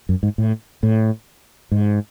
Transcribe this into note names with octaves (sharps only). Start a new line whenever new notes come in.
F#2
G#2
A2
A2
G#2